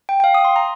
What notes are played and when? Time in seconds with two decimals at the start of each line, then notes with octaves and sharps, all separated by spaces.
0.09 G5
0.20 G5
0.24 F5
0.34 D#6
0.45 C6
0.56 A#5